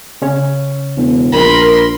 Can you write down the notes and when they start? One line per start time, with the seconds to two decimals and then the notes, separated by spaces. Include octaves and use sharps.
0.22 C#3 C#4 C#5
0.97 E1
1.32 A#1 A#4 B5 C6